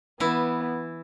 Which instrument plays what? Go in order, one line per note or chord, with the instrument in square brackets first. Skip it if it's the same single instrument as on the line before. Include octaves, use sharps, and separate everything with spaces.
[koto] E3 E4 [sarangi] B3